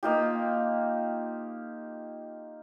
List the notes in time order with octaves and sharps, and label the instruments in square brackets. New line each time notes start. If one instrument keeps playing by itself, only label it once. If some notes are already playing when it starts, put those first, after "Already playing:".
[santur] A#3 D#4 F4 G4